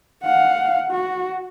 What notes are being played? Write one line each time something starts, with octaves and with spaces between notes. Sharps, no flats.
F5 F#5
F#4